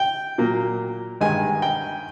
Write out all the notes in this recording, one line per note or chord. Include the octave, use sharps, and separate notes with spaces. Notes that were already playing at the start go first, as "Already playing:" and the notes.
Already playing: G5
A#2 F#3 A#3
G2 D#3 G#3 G#5
G5